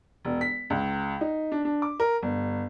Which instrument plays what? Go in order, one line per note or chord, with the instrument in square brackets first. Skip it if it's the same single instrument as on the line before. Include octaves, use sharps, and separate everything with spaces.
[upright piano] E1
B6
C#2
D#4
D4
D4
D6
A#4
G1